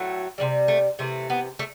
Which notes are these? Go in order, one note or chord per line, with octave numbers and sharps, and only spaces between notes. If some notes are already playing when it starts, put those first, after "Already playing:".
Already playing: A2 F#3 A3
C3 E3 G3
A3
C3 E3 A3
B3
A3